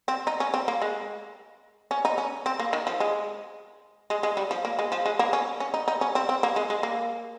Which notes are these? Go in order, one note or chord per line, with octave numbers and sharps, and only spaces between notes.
C4
D#4
C#4
C4
A#3
G#3
C#4
D#4
C#4
C4
A#3
D#3
F3
G#3
G#3
G#3
G3
F3
A#3
G#3
F3
G#3
A#3
C#4
C#4
D#4
D#4
C#4
C4
C4
A#3
G#3
G#3
A#3